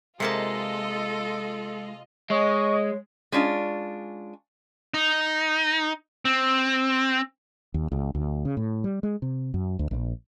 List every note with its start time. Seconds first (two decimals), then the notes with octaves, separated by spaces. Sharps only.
0.20 C3 G#3 A#3 F4 A4 D#5 A5
2.30 G#3 C#5 D#5 C#6
3.32 G#3 C#4 D4 F4
4.94 D#4
6.25 C4
7.74 D#2
7.92 C#2
8.15 D2
8.45 C#3
8.57 A2
8.84 G3
9.03 G#3
9.22 C3
9.54 F#2
9.79 D2
9.91 A#1